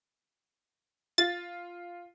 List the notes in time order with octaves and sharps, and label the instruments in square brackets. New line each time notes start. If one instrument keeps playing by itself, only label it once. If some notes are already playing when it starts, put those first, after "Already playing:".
[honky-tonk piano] F4 [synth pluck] A6